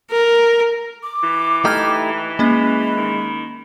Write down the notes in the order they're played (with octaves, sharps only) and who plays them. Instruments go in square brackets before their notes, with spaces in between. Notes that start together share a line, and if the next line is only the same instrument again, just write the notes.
[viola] A#4
[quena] D6
[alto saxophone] E3
[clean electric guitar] A3 D#4 G4 [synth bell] G5 F6 G#6
[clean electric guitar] G#3 [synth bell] A#3 C#4 [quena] B5
[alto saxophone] D#3